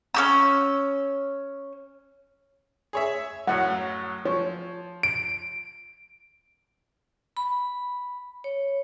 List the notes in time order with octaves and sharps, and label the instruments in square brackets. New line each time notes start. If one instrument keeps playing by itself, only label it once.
[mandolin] C#4 G4 E6
[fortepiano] G#4 C#5 E5
[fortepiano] F#2 A2 F#3 [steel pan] F#5
[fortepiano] F3 [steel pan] C#5
[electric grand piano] D7
[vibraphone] B5
C#5